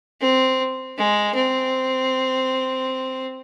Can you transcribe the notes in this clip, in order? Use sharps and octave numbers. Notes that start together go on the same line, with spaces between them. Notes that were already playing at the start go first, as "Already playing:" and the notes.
C4
G#3
C4